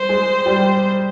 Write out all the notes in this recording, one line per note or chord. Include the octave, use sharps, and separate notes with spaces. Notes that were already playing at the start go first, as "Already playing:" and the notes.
Already playing: G3 C5
G#3 G#4
G3 G4